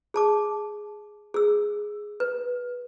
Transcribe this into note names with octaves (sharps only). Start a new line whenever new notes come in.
G#4 A5 D6
G#4 E6
B4